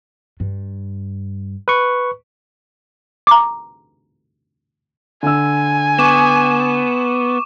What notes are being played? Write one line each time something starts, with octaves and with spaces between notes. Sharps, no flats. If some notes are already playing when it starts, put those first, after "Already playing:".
G2
B4 C#6
A#5 D6
D3 G#5 E6
B3 C#6 D6 E7